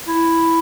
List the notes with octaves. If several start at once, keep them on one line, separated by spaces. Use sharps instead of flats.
E4